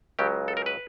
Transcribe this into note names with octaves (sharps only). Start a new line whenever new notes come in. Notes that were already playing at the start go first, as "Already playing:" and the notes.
C#2 C#3 F#3 G4
A4
A#4
B4